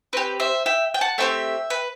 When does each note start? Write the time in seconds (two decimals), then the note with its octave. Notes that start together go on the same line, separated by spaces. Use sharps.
0.13 C4 G4 B4
0.40 C5 E5
0.66 E5 G5
0.94 G5
1.01 F#5 A5
1.18 A3 C4 G4 E5 G5
1.70 B4